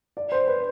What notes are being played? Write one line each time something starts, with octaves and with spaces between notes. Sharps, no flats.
D5
C5
B4